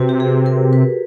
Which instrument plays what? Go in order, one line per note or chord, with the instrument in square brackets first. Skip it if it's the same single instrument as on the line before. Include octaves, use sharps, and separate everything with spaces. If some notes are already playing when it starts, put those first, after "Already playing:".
Already playing: [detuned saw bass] C3 [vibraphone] F#4 B4
[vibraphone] G4
G#4
A#4
B4